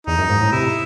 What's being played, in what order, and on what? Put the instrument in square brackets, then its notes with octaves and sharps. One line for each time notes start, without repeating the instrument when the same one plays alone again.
[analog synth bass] E2 [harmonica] D#4
[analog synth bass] F#2
G#2
A2
[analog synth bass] C3 [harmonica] E4